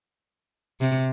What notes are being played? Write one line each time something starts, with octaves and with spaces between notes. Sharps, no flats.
C3